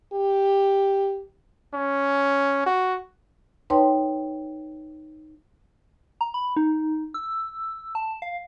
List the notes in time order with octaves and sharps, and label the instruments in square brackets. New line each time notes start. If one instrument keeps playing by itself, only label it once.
[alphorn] G4
[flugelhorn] C#4
F#4
[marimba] D#4 B4 C#5 G5 A5 C6
[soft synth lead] A#5
B5
D#4
E6
A5
F5